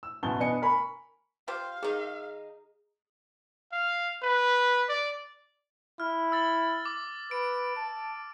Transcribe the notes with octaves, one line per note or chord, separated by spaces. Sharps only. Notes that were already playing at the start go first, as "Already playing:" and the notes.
E6
A1 F#2 B2 A5 G7
B3 D4 D#5 G#5 C#7
A#4 G#5 B5 C#6
F4 G4 C5 F5
D#3 D#4 G#4
F5
B4
D5
E4 F6
E6 A6
D6
B4 D7
A5